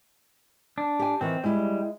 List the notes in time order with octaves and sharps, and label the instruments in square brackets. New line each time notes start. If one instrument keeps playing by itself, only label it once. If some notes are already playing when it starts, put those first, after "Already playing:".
[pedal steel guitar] D4
[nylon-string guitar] G4 G#5
[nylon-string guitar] D#3 E3 [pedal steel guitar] C4
[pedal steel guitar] G3 [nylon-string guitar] G#3 E4